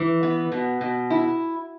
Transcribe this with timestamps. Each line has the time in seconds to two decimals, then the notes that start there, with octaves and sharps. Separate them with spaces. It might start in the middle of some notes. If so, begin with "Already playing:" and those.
Already playing: E3
0.23 B3
0.52 B2
0.81 B2
1.10 E4